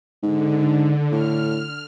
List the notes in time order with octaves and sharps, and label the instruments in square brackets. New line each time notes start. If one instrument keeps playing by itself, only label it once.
[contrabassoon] G#2 [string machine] D3
[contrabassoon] A2 [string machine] F6